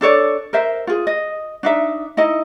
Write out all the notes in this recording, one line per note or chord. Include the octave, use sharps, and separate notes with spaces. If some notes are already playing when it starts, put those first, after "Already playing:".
D4 A4 C#5 D5
A#4 C5 E5
F4 G#4
D#5
D4 D#4 E5
D#4 E4 D#5